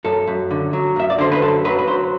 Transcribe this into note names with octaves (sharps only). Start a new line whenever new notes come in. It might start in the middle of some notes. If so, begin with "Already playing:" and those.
F#2 A4
F#2
D3
F#3
F#2 E5
D5
D3 C5
B4
F#2 A4
F#3 B4
B4
F#3 C5